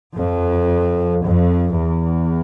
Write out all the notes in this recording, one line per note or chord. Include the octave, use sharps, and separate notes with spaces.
F2
F2
E2